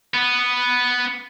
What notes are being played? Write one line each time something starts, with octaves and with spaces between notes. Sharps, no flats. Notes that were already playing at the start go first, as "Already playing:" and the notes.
B3